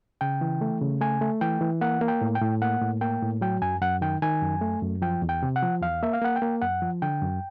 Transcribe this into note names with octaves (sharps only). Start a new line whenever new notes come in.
C#3 G5
E3
A3
C#3
A3 G#5
A3
E3 G5
E3
A#3 F#5
A#3
G5
A2
G5
A2
A#3 F#5
A2
A#3 G5
A2
F#3 G5
F#2 G#5
F#2 F#5
D#3 G5
D#3 G#5
F#2
A3
F#2
F3 G5
E2
G5
C3
F#5
F3
E2 F5
A#3 E5
F5
A#3 F#5
G5
A#3
F#2 F#5
F3
D3 G5
F#2